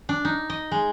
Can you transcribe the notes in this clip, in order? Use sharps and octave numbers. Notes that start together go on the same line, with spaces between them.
D4
D#4
D#5
G#3